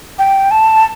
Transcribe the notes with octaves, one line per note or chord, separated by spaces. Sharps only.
G5
A5